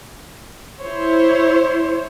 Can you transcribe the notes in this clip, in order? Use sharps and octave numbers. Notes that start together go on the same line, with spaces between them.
E4 C5 C#5